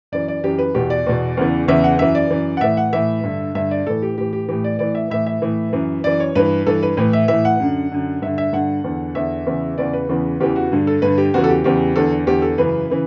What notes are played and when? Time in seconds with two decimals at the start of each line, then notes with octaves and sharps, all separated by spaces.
0.12 F#2 E3 D5
0.28 D5
0.44 F#2 E3 G4
0.59 B4
0.74 E2 B2 G4
0.90 D5
1.06 E2 B2
1.37 E2 C#3 E3
1.68 E2 C#3 E3 E5
1.84 F#5
1.99 F#2 E3 E5
2.15 D5
2.30 F#2 E3
2.57 F#5
2.61 A2 E3 E5
2.77 F#5
2.93 A2 E3 E5
3.23 G2 D3
3.55 G2 D3 E5
3.71 D5
3.86 A2 E3 A4
4.02 G4
4.17 A2 E3 G4
4.33 G4
4.49 A2 E3 G4
4.64 D5
4.79 A2 E3 D5
4.95 E5
5.10 A2 E3 E5
5.26 E5
5.42 A2 E3
5.73 F#2 E3
6.04 F#2 E3 D5
6.20 C#5
6.35 G2 E3 B4
6.67 G2 E3 A4
6.83 B4
6.97 A2 E3 B4
7.13 E5
7.28 A2 E3 E5
7.45 F#5
7.60 F#2 D3
7.92 F#2 D3
8.22 G2 D3 E5
8.38 E5
8.53 G2 D3 F#5
8.84 E2 D3
9.15 E2 D3 E5
9.46 E2 C#3 E3
9.78 E2 C#3 E3 D5
9.93 B4
10.09 E2 C#3 E3
10.40 E2 C#3 E3 G4
10.56 F#4
10.72 G2 D3
10.87 A4
11.02 G2 D3 B4
11.18 G4
11.34 E2 C#3 E3 F#4
11.44 A4
11.49 G4
11.64 E2 C#3 E3 G4
11.96 E2 D3 A4
12.27 E2 D3 G4
12.42 A4
12.58 F#2 C#3 E3 B4
12.90 C#3 E3